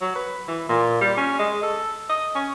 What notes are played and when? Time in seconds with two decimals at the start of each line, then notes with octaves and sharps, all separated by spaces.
0.01 F#3
0.15 B4
0.48 E3
0.69 A#2
1.01 G3
1.17 C#4
1.39 G#3
1.62 A4
2.09 D#5
2.35 C#4